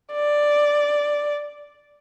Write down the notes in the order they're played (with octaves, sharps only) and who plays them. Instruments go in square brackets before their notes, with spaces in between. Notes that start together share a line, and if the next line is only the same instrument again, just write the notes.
[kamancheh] D5